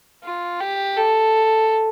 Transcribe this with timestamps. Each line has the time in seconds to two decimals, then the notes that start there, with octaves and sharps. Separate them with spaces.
0.24 F4
0.60 G4
0.97 A4